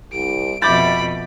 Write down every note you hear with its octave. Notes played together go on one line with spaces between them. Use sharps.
C2 D7
F2 B2 E5 B5 D6 G6 A6 D7